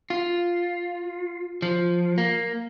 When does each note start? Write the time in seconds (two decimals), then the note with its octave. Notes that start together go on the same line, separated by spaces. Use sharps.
0.10 F4
1.62 F3
2.18 A#3